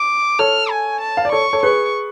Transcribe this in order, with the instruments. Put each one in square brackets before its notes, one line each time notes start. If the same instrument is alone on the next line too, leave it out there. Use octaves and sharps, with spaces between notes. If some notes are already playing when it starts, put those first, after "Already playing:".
Already playing: [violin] D6
[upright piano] A4 C#5 [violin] F6
[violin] G#5
A5
[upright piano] F5
D5
[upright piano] A4 C#5 [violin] C#6
[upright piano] A4 C#5
[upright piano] G#4 B4 [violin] C#6